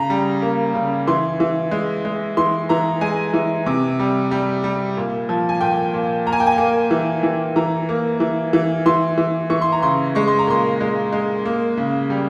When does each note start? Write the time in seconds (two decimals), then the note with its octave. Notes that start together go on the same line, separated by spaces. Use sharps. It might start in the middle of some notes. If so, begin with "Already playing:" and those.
Already playing: C#3 A#5
0.10 G3
0.42 A#3
0.74 C#3
1.07 E3 C6
1.40 E3
1.71 G#3
2.05 G#3
2.37 E3 C6
2.69 E3 A#5
3.01 G#3 G#5
3.34 E3
3.66 C3
3.99 G3
4.31 G3
4.64 G3
4.97 A#2
5.29 F3
5.49 G#5
5.61 A#2 G5
5.94 A#2
6.26 A#3 A#5
6.33 G#5
6.40 G5
6.47 G#5
6.58 A#3
6.91 E3
7.23 E3
7.56 E3 A#5
7.89 A#3
8.20 E3
8.53 E3
8.86 E3 C6
9.18 E3
9.50 E3 C#6
9.62 C6
9.72 A#5
9.83 C#3 C6
10.15 G#3 C#6
10.28 C6
10.39 A#5
10.47 A#2 C6
10.81 G#3
11.13 G#3
11.45 A#3
11.77 C#3
12.10 G3